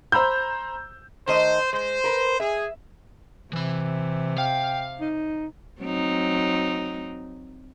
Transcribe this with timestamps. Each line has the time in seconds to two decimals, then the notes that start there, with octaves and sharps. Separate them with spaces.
0.12 C5 A#5 B5 E6 G6
1.27 D#3 A3 C5 D#5
1.73 G#3 C5
2.04 A#4 B4
2.40 G#4 E5
3.53 C3 E3 B5
4.38 F5 G5
5.01 D#4
5.80 F#3 C4 D#4